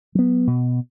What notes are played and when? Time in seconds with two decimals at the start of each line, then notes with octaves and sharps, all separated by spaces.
0.15 F#3 B3
0.47 B2